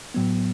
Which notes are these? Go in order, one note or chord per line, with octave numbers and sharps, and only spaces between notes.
A2 F#3 B3